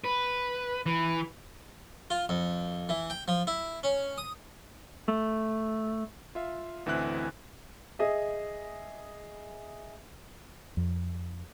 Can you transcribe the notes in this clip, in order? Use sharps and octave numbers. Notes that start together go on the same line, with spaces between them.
B4
E3
F4
F2
E3
G5
F3
E4
C#4
D#6
A3
F4 E5 F5
A1 D2 E3 C4 E4 F#6
G#4 D#5 E5
F2